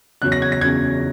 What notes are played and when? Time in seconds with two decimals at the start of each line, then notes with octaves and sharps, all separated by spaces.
0.22 E2 C#3 F#3 C#4 F#6
0.32 A#6
0.42 G#6
0.52 A#6
0.61 E2 C#3 F#3 C#4 G#6